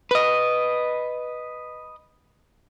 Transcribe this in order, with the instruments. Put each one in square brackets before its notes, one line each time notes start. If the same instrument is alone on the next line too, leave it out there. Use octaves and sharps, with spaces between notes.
[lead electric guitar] B4 D#5